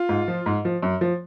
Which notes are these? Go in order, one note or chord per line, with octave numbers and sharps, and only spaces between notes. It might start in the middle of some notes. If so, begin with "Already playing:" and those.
Already playing: F4
G#2
F3
G#2
F3
F#2
F3